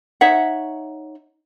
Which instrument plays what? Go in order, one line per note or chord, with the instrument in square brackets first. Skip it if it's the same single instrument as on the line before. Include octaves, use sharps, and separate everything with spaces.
[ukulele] D#4 C#5 E5 F#5